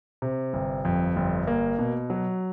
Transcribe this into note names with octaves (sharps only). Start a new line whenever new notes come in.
C3
G1
F2
G1
A#3
B2
F#3